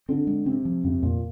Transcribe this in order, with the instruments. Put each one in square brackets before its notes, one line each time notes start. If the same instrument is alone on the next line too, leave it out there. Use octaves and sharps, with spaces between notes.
[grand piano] D3 [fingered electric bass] C4
[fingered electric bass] G#3
[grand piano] C3 [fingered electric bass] C4
[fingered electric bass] F3
[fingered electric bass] F2 [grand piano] C3
[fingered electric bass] F2 [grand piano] A#2